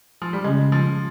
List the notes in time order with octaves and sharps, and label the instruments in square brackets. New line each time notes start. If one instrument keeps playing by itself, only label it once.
[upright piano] F3
G3
[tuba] C#3 [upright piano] G#3
[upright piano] F3